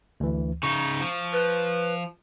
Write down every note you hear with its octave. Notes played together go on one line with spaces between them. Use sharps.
D2 E3
C#3 D#4 C#6
F3
B4